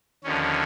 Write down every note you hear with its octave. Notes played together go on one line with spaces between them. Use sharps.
D#2 D3 F3 C#4